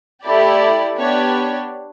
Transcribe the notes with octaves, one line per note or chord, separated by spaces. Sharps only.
A3 E4 G4 D5
B3 D4 G4 C#5